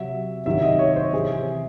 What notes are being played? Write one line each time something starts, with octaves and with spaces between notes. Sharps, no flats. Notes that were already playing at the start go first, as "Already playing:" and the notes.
Already playing: C3 F#3 E5
C3 D#3 F#3 E5
D#5
C#5
C5
C3 E3 G#4